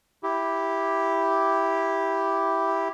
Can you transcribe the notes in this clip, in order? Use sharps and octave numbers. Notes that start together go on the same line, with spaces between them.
E4 G4